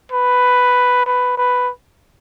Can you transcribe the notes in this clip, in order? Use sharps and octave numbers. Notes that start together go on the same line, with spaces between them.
B4
B4
B4